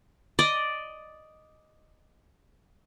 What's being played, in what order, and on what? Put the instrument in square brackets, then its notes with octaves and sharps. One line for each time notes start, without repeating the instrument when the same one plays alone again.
[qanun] D5 D#5